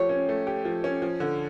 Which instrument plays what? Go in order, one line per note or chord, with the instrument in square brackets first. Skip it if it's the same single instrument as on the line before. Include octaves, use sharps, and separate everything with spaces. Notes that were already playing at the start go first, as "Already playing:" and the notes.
Already playing: [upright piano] F3 A3 G4 [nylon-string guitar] C#5
[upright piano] C#4
A3
G4
F3
C#4
F3
D3